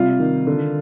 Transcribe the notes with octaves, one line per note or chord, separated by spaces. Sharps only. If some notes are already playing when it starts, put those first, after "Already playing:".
Already playing: C3 G3 F4
D#3
D3